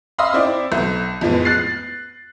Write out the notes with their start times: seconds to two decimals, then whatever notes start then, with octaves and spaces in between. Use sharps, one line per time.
0.18 D#5 F5 B5 C6 D#6 E6
0.33 C4 E4 D5
0.72 B1
1.21 F2 A2 G#3 B3
1.45 F#6 A6 C7